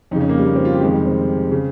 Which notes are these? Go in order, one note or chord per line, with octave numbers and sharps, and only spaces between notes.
F2 C#3 D#4
C#4
A#3
G3
A#3
C4
F4
G4
F2 C3 D#3 G#3
G3
C4
C#3